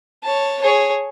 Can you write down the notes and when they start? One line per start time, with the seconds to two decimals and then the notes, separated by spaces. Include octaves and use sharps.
0.24 C#5 A5
0.62 G#4 C#5